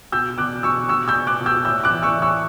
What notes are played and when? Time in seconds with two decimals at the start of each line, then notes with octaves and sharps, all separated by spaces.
0.12 B2 E6 G6
0.38 B2 D6 F#6
0.63 B2 C#6 E6
0.88 B2 C#6 E6
1.08 E6 G6
1.14 B2
1.27 D6 F#6
1.40 B2
1.46 E6 G6
1.65 A2 E6 G6
1.84 D6 F#6
1.90 E3
2.03 C#6 E6
2.16 A2
2.22 C#6 E6